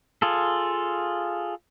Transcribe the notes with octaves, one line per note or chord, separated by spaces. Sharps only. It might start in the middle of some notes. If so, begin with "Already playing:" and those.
F4 G#4 A4